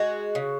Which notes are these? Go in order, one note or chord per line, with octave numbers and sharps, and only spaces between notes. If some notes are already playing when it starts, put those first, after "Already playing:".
Already playing: G#3 F#4
C#3